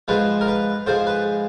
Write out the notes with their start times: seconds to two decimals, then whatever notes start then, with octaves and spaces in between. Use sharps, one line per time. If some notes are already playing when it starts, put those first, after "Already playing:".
0.08 G#2 F3 G#3 B4
0.41 A#4
0.48 B4
0.86 G#2 F3 G#3 C5
1.07 B4